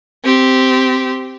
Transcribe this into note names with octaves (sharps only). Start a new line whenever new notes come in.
C4 G4